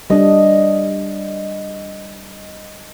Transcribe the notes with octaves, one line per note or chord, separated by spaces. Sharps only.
G3 D4 D#5